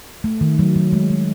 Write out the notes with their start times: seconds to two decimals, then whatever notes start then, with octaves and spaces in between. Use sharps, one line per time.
0.24 A3
0.41 D#3
0.59 F#3
0.76 F#3
0.93 G#3
1.10 G#3